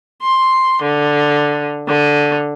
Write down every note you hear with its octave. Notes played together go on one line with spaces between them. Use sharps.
C6
D3
D3